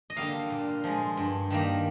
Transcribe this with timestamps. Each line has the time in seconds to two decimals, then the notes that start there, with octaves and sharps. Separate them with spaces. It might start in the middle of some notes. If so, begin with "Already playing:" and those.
0.10 D#5
0.16 D3 G3 A#3 F5
0.50 A#2
0.84 F3 G#3
1.17 G2
1.50 D#3 G3 A#3